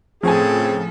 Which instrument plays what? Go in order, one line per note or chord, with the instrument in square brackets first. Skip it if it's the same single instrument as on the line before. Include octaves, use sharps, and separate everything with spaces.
[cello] A2 A4 [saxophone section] C#3 C4 [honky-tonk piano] F3 G#5 [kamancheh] G#4